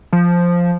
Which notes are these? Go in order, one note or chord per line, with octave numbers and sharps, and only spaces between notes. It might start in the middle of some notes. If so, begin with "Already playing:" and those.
F3